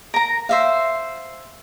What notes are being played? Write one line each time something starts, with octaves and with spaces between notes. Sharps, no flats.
A#4 A#5
C5 E5 F5